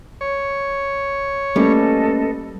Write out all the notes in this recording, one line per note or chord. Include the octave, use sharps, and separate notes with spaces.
C#5
G3 A3 A#3 C#4 A4 B4 D#5